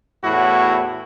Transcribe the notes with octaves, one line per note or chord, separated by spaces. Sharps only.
E2 A2 E4 F#4